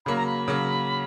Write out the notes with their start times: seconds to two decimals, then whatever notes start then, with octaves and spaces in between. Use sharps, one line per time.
0.06 C#3 F#3 A#3 B5
0.16 A#5
0.26 B5
0.48 C#3 F#3 A#3